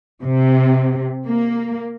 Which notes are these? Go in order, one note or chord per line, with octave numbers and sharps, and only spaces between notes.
C3
A#3